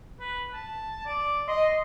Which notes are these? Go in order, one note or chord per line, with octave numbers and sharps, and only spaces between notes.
B4
A5
D5
D#5 C6